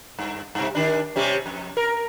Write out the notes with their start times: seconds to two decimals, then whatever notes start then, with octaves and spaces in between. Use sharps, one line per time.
0.19 G2
0.55 G2 C3
0.75 D#3 D4
1.16 C3 G3 C#4
1.46 F2
1.77 A#4